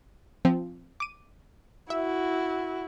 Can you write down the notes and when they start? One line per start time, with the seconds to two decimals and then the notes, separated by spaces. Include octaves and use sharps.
0.45 F3 C4
1.00 D6 D#7
1.90 E4 F#4 E5